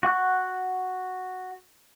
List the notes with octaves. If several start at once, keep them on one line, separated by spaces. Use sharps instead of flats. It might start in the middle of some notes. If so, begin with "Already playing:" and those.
F#4 F#5 C#6 F#6